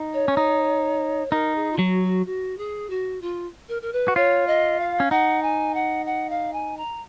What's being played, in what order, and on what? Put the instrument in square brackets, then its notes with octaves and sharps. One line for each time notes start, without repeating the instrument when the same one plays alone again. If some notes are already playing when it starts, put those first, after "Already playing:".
Already playing: [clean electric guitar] D#4
[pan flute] C#5
[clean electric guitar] C#4
D#4
[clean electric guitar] D#4 [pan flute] A#4
[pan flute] G#4
F4
[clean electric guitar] F#3 [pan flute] F#4
[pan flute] F#4
F#4
G#4
F#4
F4
A#4
A#4
B4
[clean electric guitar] F#4
[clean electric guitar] F4 [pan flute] C#5
[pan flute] D#5
F5
[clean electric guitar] C#4
[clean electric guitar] D#4 [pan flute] F#5
[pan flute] G#5
F#5
F#5
F5
G#5
A#5